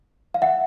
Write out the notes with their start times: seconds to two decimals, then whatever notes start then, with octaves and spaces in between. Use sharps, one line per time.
0.34 F5
0.42 E5 F#5